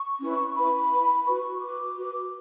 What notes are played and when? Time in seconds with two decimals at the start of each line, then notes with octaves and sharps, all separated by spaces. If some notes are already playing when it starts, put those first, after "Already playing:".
Already playing: C#6
0.21 C#4 E4 B4
0.55 E4 B4 B5
0.91 E4 B4
1.25 F#4 B4 C#6
1.60 F#4 B4 D6
1.97 F#4 B4